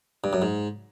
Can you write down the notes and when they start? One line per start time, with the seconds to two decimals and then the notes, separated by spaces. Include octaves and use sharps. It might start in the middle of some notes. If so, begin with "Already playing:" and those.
0.24 G2
0.33 F#2
0.42 G#2